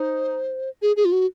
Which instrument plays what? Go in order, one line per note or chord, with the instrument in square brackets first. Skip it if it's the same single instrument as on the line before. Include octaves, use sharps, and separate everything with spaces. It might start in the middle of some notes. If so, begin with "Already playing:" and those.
Already playing: [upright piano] D#4 [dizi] C5
[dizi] G#4
G#4
F4
F#4